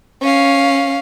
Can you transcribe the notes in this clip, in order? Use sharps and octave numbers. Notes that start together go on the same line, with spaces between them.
C#4 F5